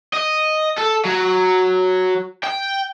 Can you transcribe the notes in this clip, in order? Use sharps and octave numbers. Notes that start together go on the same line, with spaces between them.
D#5
A4
F#3
G5